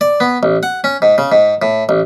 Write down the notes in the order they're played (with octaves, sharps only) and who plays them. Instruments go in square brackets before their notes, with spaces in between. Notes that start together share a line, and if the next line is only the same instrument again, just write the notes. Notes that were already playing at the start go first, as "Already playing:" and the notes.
[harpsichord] D5
B3
A1
F#5
C#4
G#2
C#3
G#2
A2
A1